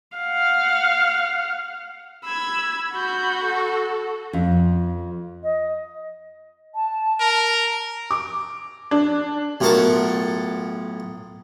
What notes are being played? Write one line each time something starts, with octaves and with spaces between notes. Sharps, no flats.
F5 F#5
B5 E6 G#6
F#4 B5 G6
A4
F2
D#5
A5
A#4
A#5
D6
D4
B1 A2 F4 A#4 F#5 A5